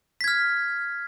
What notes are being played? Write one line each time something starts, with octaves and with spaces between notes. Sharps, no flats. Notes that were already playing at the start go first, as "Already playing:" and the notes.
F6 G#6 B6